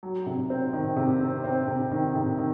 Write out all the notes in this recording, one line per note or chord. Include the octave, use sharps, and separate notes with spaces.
F#3
C3
C4
D#3
C3
C4
C4
C3
D#3
C3
D#3